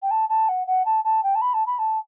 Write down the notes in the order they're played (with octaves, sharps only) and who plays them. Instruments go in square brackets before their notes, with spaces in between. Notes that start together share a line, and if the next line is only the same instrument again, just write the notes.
[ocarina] G5
A5
A5
F#5
F#5
A5
A5
G5
A5
B5
A5
B5
A5